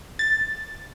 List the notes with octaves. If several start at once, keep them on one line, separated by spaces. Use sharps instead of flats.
A6